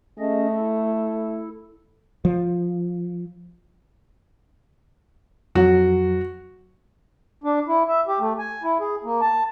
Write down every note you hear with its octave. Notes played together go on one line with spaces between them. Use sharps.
A3 C#4 G#4 D#5
E4 A4
F3
F2 F#3 F#4
D4
E4
E5
G4
A3
G#5
E4
G#4
A#3
A5